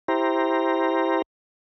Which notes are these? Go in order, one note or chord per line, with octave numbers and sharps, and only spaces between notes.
E4 G4 C5 A#5